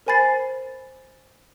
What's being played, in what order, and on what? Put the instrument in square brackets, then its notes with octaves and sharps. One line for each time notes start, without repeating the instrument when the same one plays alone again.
[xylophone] A#4 C5 G#5 B5 A6 C7